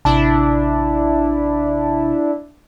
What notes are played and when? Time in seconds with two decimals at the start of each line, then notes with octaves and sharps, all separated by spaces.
0.05 A1 C3 D4 E4 A5